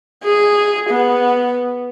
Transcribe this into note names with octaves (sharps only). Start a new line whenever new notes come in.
G#4
B3